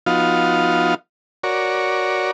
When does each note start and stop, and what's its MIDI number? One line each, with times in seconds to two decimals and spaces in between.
0.06 0.94 53
0.06 0.94 59
0.06 0.94 63
0.06 0.94 65
0.06 0.94 66
0.06 0.94 77
1.43 2.31 66
1.43 2.31 70
1.43 2.31 73
1.43 2.31 74